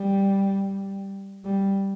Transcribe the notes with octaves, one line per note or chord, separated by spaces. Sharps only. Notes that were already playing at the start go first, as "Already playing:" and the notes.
Already playing: G3
G3